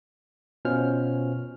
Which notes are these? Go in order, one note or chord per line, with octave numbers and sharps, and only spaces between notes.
B2 C#4 F4 C5 F6